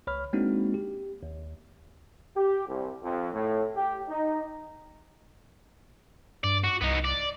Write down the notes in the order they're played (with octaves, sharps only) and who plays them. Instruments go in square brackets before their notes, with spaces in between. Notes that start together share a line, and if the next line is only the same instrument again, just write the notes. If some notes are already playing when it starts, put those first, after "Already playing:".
[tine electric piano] C#2 C#5 B5 F6
G#3 A#3 C4 D4 D#4 F#4
G4
D#2
[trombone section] G4
C2
F2
A2
G4
D#4
[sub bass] G2 [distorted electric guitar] D5
[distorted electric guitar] F#4
[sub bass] C2 [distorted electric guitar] B3 D#4
[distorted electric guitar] D5